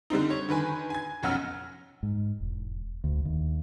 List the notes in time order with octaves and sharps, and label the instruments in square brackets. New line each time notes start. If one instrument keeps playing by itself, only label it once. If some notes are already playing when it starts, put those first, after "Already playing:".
[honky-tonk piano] D3 G3 C4 D#4
C#5
D3 D#3 B4 G#5
G#5 G#6
F1 B1 C#4 F#5 E6 F6
[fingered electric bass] G#2
E1
D2
D#2